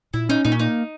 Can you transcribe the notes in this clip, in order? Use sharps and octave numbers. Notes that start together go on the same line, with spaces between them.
A#2 E4
C#4 D#4
A#2 D#4
C#4
A#3 D#4